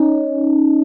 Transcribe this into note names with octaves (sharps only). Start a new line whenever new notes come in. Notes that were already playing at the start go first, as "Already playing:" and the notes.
Already playing: C#4 D#4